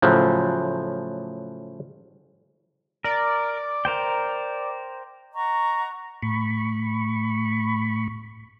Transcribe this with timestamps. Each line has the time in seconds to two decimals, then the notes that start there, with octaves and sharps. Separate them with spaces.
0.02 A2 C#3 F3 F#3
3.04 A#4 D5
3.85 A#4 C5 G5
5.34 D#5 F#5 A#5 C#6
6.22 A2 B5 C#6